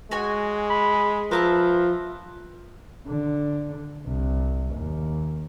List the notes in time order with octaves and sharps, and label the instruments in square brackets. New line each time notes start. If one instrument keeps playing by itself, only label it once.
[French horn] G#3 [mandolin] F#4 C#5 G#5
[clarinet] B5
[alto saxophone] F3 [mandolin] A#4 E5 A5 [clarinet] B4
[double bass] D3
C2
D#2